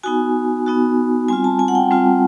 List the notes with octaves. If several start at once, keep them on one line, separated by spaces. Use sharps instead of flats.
B3 D#4 F#4 G#5
B3 D#4 F#4
G3 C4 F4 G#5
A5
G#5
F#5
G5
G3 C4 F4